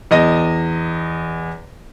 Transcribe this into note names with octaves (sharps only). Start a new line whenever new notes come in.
E2 D#5 A#6